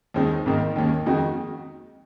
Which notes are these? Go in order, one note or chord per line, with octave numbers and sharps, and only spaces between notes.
D#2 D#3 G#3 C4 D#4
G#1 G#2 D#3 A#3
D#2 D#3 A#3 C#4
F2 D#3 G#3 D#4 F#4